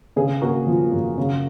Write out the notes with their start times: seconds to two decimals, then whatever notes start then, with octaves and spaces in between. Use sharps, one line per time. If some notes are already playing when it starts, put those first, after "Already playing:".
0.16 C#3 G#4
0.42 A#3 F#4 A#4
0.67 F3
0.92 F#2
1.18 C#3